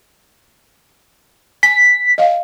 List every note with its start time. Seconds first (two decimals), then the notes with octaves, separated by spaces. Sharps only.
1.63 G#5 B6
2.18 D#5 F5